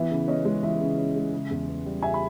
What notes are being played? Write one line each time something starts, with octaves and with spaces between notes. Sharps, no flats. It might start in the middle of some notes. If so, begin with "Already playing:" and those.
Already playing: E3 B3 E5
C#3
C#4 D#5
G#3
E3 E5
C#3
C#4
G#3
C#3
E2
B3
G3
C#3 E5 G#5
B5